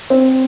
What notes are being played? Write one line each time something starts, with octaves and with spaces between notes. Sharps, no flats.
C4